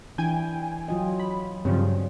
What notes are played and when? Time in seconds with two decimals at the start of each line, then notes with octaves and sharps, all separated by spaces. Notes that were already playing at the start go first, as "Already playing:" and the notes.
0.18 E3 D4 E4 G5 G#5
0.88 F#3 F4 D#5
1.19 B5
1.65 G2 C#3 F3 F#3 C4 C#5